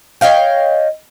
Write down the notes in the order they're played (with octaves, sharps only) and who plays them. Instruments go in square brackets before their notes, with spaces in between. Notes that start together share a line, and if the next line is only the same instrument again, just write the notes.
[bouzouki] C#5 D#5 F5 G5